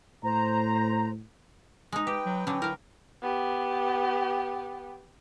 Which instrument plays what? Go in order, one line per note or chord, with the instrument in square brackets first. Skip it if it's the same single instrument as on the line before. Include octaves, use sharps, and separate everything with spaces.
[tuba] A2 [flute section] C5 A#5
[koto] G#3 D#4
[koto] G4 [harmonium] B4 G5
[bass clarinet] F#3
[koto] D3 F#3 [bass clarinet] C#4
[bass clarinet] E4 [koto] A#4 F5
[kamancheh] B3 G4